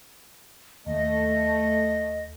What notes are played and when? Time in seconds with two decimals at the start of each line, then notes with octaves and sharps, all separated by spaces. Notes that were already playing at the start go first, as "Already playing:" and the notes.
0.86 D#2 A3 D#5